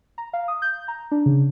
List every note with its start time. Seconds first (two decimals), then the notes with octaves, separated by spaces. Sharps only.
0.18 A#5
0.33 F5
0.48 D#6
0.62 G6
0.88 A#5
1.11 D4
1.26 C#3